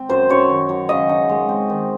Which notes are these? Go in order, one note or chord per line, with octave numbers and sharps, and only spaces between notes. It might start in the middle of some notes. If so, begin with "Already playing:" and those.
Already playing: C4
F#2 C5
F#2 C#5
D#3
F#3
C#3 D#5
D#4
G#3
C4
D#3